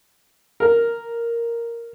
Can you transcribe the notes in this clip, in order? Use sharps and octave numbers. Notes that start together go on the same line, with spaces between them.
A#4